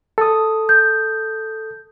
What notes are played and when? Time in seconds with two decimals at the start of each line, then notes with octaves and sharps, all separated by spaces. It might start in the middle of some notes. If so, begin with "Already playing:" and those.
0.18 A4 D#6
0.69 G6